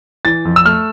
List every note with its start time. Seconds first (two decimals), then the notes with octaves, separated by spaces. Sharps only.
0.25 E3 A6
0.45 F2
0.56 E6
0.66 A3 F6